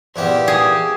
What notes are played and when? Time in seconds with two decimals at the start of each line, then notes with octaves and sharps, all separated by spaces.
0.16 E2 A#2 B3 G4 E5
0.48 G#4